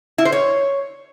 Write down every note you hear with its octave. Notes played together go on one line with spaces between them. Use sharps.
E4
C5
C#5